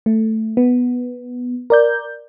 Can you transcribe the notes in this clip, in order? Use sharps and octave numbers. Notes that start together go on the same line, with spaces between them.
A3
B3
A#4 D5 G6